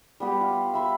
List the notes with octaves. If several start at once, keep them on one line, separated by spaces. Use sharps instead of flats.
G3 B3 G4
F4
E5 B5 C6